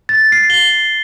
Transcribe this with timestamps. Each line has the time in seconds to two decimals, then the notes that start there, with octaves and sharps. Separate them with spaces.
0.09 A6
0.32 C7
0.50 G7